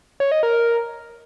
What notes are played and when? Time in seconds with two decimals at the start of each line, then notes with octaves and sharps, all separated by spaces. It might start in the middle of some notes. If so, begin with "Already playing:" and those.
0.20 C#5
0.32 D#5
0.43 A#4